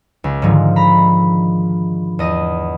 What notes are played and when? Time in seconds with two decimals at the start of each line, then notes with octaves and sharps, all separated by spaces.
0.24 C#2
0.42 G#2 D3 D#3 F3
0.76 A#5 B5
2.19 E2 D#5 D#7